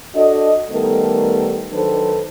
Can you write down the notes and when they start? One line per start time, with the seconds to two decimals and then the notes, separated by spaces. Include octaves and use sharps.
0.15 D4 F#4 A4 D#5
0.71 D#3 G3 A3 B3 A4 A#4
1.72 D#3 F#3 D4 A4 B4 C5